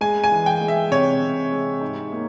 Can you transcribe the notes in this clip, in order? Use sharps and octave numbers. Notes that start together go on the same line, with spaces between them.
G#3 G#5
G#5
E3
G5
G#3
E5
C3 C#5
C3
G#3
G#2
A#3